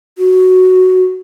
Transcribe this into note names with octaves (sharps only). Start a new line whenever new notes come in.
F#4